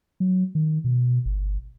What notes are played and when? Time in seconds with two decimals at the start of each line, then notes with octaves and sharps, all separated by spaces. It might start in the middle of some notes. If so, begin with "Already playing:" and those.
0.20 F#3
0.55 D#3
0.84 B2
1.25 G1